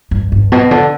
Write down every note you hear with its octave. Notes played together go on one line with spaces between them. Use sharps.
G2
G2
B2
D3